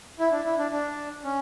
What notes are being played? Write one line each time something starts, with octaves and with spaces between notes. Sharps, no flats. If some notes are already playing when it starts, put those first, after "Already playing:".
E4
D4
E4
D4
D4
C#4